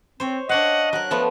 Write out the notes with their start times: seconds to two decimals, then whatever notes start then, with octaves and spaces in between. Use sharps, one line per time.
0.20 C4 C5 C#5
0.49 D4 C#5 D#5 F5 F#5
0.93 F#3 A#4 F#6
1.11 F3 A3 B3